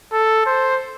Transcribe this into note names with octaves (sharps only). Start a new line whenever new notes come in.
A4
C5